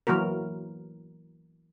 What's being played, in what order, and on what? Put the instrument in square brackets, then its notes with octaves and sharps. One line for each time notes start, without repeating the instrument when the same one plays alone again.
[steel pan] E3 F#3 A#3 F#4 A#4